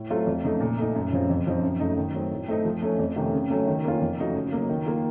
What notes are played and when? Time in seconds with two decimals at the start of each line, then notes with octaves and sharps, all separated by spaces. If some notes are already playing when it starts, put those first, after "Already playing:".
Already playing: A2
0.10 F#3 A3 C4 F4
0.27 F2
0.44 C#3 A3 D#4
0.60 A#2
0.77 A3 D#4
0.95 F#2
1.12 C#3 F3 C4 F4
1.29 F2
1.47 C#3 F3 C4 D#4
1.63 F#2
1.80 C#3 F#3 A3 D#4
1.97 D#3
2.14 F#3 A3 C4
2.32 A2
2.48 A3 C4 D#4
2.65 F3
2.82 A3 C#4
2.99 F2
3.16 C3 D#3 A3 C#4
3.32 C#3
3.50 F#3 A3 C#4
3.67 D#3
3.84 A#3 C#4 F4
4.02 F2
4.18 C#3 A3 D#4 F#4
4.35 C#3
4.52 F#3 A#3
4.69 D#3
4.86 A#3 F4